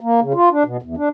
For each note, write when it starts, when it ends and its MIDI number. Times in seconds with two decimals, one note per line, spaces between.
0.01 0.20 58
0.21 0.33 49
0.34 0.49 65
0.51 0.63 62
0.65 0.77 47
0.82 0.95 40
0.97 1.09 62